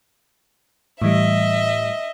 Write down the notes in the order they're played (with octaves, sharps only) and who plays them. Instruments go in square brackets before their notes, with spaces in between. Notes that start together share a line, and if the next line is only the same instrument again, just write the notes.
[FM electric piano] A2 E3 G3 [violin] D#5 E5